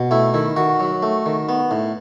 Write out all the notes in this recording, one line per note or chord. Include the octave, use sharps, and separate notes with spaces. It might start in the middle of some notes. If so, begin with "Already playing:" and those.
Already playing: B2
A3 E4
D#3 E4
D#3 F#4
F#3
A3
D#3
B3
A2